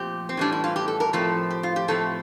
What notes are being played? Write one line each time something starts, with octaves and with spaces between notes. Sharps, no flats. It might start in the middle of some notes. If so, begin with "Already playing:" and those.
Already playing: A#2 F3 A3 C4 G4
C4
A2 E3 G3 D4
E4
F4
G4
A4
A#4
A2 F3 A3 C4 A4
G4
F4
G4
A2 F3 A3 C4 A4